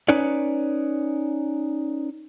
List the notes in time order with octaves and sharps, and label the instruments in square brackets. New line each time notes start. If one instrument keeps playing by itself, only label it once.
[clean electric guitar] C#4 D#4 B4 C#5 D5